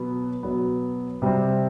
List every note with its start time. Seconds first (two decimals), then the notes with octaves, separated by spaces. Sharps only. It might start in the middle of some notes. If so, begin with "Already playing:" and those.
Already playing: B2 F#3 B3
0.43 B2 F#3 B3
1.22 C3 G3 C4